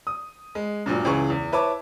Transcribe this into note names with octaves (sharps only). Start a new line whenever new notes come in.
D#6
G#3
G2 A#2 F#3
C#2 E3 G#4 C#6
E2
E4 B4 C#5 A5 D6